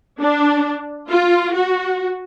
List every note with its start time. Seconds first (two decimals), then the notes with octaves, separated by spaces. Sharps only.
0.19 D4
1.09 F4
1.54 F#4